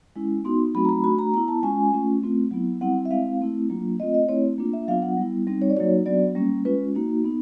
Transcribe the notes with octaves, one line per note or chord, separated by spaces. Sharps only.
G#3 C#4 E4
B3 D#4 F#4 C6
F#3 A3 C4 D#4 F#4 B5
A#5
B5
A3 D4 F#4 B5
A#5
B3 E4 A#5
A5
G#3 C#4 F4 G#5
A3 C#4 F4
A3 C4 F4
F#3 B3 E4
G3 C4 E4 F#5
E5
G#3 C4 E4 F5
A3 C4 E4
F#3 A#3 D4 F4
A3 C4 F4 D#5
D#5
A3 C4 E4 C#5
A#3 D4 F4
E5
F#3 B3 D4 F4 F5
F#5
G3 B3 E4
G3 C4 D#4
C#5
D5
F#3 A#3 D#4 F#4 C#5
F#3 B3 D4 F#4 D5
G3 A#3 C#4
G#3 C#4 F4 B4
A#3 D#4 F#4
B3 D#4